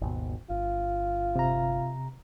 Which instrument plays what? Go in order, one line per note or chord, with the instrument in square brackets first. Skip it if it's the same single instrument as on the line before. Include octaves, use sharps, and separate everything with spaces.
[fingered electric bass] G#1 D#2 B2
[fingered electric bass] G1 [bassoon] F4
[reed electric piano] C3 A#5